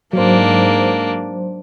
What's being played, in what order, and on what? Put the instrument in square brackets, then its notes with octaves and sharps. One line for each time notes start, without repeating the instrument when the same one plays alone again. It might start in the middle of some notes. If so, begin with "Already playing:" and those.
[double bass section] G#2 [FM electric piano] F#3 C5 [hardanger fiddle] A#3 D4